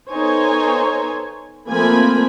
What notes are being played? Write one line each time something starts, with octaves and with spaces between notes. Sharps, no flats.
B3 D#4 A4 C5 C#5 G#5
F3 A3 A#3 C4 G#5 B5